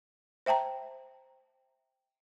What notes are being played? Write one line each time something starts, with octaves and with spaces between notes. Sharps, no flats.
C5 E5 G5 A5 A#5